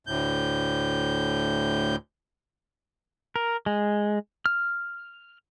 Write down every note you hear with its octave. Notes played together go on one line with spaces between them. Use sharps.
D2 A2 G6
A#4
G#3
F6